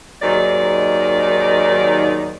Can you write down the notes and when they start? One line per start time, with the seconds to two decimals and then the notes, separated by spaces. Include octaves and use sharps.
0.21 D#2 G#2 D#3 F#3 D#4 D5